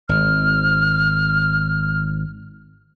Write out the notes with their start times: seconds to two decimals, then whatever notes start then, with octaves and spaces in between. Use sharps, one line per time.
0.09 G#1 F6